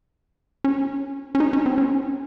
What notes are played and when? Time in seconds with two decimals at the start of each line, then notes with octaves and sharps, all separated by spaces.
0.64 C#4
1.35 C#4
1.40 D#4
1.53 C#4
1.66 C4
1.78 C#4